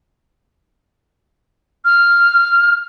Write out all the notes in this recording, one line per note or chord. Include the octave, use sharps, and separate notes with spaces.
F6